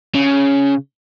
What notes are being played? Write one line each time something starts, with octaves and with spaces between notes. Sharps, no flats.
C#3